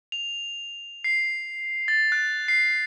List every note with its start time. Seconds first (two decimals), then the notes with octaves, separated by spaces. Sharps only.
0.12 F7
1.04 C7
1.88 A6
2.12 F#6
2.48 C7